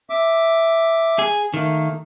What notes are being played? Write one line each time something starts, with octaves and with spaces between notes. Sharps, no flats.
E5 D6
G#4
D#3 A3 A#3